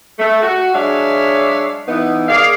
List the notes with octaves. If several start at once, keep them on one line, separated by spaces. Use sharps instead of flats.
A3
F#4
F#3 G#3 D4 C#5 E5 F5
E3 B3 D#4
G#4 A#4 D5 F5